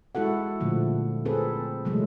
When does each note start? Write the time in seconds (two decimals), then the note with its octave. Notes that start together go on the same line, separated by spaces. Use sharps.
0.15 G#3 E4 F#4 A4 F#5
0.60 A#2 D3 F3 A3
1.25 C4 G#4 A4 B4
1.85 C3 E3 F#3 G#3 A3